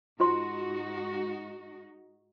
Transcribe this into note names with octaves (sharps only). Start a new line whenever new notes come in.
G#2 D#4 F4 F#4 C5 C6